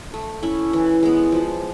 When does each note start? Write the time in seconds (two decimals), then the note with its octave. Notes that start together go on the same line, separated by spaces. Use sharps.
0.14 A3
0.43 C#4 E4
0.73 E3
1.03 G#3 B3
1.32 F3